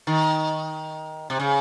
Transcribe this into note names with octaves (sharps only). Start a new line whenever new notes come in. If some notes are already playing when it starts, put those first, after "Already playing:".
D#3
C3
C#3